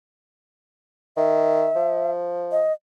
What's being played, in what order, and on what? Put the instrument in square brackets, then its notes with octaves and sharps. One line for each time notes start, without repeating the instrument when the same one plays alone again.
[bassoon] D#3 [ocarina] E5
[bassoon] F3
[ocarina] D#5